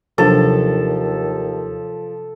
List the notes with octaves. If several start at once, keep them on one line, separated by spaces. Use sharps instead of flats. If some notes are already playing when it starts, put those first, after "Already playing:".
D#2 C3 F3 F#3 D4 A4